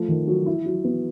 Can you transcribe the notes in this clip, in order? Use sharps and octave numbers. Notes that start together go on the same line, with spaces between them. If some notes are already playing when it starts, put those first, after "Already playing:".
Already playing: F3 A3
D#3
F#3
E4
F#3
B3